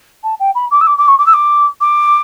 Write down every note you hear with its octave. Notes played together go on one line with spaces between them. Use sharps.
A5
G5
B5
D6
E6
D6
D6
C#6
D6
E6
D6
D6